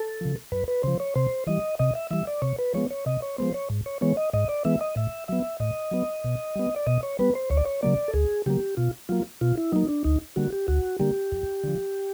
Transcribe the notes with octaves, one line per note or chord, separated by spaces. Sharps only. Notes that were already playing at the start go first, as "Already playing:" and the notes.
Already playing: A4
C#3 F3
F#2 B4
B4
C#3 F3 C5
C#5
C3 C5
E3 G3 D#5
C3 D#5
E5
E3 G3 E5
D5
C3 C#5
B4
F3 G#3 B3 C#5
C#5
C3 D#5
C#5
F3 G#3 B3 C5
C#5
G#2
C#5
E3 G#3 B3 C#5
D#5
G#2 D#5
D5
E3 G#3 B3 E5
D#5
A2 E5
F#3 B3 E5
A2 D#5
F#3 B3
B2
G3 B3
D5
B2 D#5
C#5
G3 B3 B4
C5
D2 C#5
D5
C#5
C#3 F#3 A#3 D5
A4
D2 G#4
C#3 F#3 A#3 G4
B2 F4
F#3 A#3 F4
B2 F4
E4
F#3 A#3 D#4
D4
D2 D#4
D3 G3 A#3 F#4
G4
D2 F#4
D3 G3 A#3 G4
F2
D3 F3